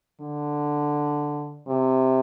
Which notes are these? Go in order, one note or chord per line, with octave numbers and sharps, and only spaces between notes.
D3
C3